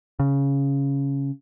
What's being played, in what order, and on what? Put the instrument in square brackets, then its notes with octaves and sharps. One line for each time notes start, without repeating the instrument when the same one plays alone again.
[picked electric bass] C#3